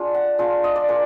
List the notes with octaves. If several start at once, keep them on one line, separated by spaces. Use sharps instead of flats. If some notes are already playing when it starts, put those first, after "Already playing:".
Already playing: G#3 D4 F4
F#5
G#3 D4 F4 F5
D#5
D5
G#3 D4 F4 A#4